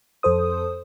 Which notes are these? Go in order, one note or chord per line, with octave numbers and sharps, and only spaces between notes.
F2 A4 C5 D#6